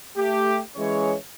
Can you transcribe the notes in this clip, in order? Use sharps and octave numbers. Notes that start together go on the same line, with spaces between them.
A3 G4
E3 G#3 C#4 G#4 C#5